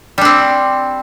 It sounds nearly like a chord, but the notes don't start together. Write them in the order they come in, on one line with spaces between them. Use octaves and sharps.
G3 D4 C4